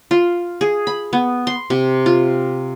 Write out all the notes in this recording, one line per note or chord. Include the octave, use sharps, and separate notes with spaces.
F4
G#4
B5
B3
C6
C3
F4